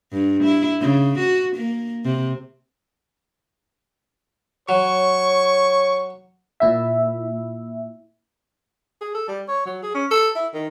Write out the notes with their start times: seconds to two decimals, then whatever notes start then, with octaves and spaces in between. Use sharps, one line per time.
0.12 G2
0.43 E4
0.80 C#3
1.19 F#4
1.56 A#3
2.05 C3
4.69 F#3 C#5 C#6
6.60 A#2 E4 E5
9.01 G#4
9.15 A4
9.28 G3
9.48 C#5
9.66 F#3
9.83 G#4
9.94 C#4
10.11 A4
10.36 E4
10.54 D#3